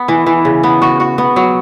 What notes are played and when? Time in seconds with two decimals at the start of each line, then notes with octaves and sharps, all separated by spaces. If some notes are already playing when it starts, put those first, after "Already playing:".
Already playing: B3
0.08 E3
0.26 E3
0.45 C#3
0.63 B3
0.82 F#4
1.00 F#4
1.18 B3
1.36 F#3